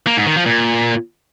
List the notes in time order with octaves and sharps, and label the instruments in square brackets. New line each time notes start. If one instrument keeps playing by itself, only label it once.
[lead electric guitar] A#3
G#2
D#3
F3
A#2